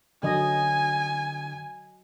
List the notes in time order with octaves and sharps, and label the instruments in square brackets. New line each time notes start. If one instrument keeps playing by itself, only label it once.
[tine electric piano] D3 [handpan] F#3 D#5 [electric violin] G#5